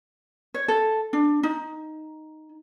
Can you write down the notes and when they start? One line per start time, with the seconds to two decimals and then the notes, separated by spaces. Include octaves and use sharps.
0.54 C#5
0.68 A4
1.13 D4
1.43 D#4